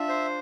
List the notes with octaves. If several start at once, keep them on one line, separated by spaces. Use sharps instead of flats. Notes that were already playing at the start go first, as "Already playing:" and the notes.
Already playing: D4 F4 E5
C5